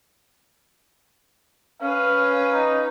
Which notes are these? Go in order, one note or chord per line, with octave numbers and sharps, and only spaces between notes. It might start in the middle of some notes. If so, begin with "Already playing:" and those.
C#4 B4 F5
D#4